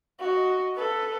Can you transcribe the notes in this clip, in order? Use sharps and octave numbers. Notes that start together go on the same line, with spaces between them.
F#4 D#5
A4 B4